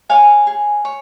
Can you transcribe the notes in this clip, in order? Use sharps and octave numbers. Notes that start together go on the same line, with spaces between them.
C#5 F5 G#5
G#4
C#5